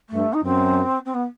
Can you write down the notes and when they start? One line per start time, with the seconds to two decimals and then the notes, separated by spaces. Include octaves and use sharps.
0.09 G2 A3
0.33 D#4
0.44 F#2 C4
1.05 C4
1.14 B3